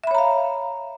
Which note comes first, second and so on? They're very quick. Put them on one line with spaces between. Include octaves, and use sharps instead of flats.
E5 B5 C#5 A#5 F5